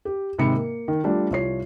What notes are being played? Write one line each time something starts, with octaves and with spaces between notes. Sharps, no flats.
G4
G#2 C3 D#3 B5 C#7
A#3
D#3
F3 G3 A3 D4
C2 F3 C#5 C7